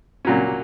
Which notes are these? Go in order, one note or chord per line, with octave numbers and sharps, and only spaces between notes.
A#2 F#3 C#4